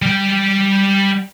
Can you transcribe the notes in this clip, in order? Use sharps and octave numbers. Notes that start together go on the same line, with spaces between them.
G3 G5